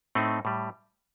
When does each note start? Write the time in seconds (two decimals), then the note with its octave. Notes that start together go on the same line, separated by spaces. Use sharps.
0.15 A2 A3 C4 D#4
0.45 A2 G3